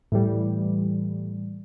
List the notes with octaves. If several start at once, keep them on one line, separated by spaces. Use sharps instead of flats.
A2 E3 G3